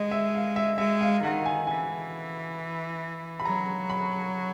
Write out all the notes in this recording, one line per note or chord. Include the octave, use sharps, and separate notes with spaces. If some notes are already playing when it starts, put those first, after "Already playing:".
Already playing: G#3 D#5
E5
F5
E5
G#3 E5
F5
D#3 F#5
G#5
E3 G#5
B5
F#3 A#5
B5